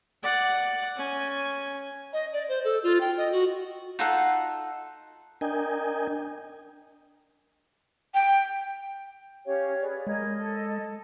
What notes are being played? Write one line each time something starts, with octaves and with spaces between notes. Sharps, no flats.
D5 F#5
C#4 G#5
D#5
D5
C5
A4
F4
G5
D#5
F#4
D#4 F4 A4 F#5
D4 A#4 D#5 G5 G#5
G5
C#4 G4 C#5 F5
G#4 B4 D5
G#3 A#4 D#5 G#6
A4